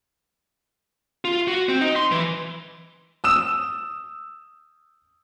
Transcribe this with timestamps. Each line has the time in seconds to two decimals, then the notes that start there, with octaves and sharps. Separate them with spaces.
1.25 F4
1.48 F#4
1.69 C4
1.81 D#4
1.96 C6
2.12 E3
3.24 D#6 E6 E7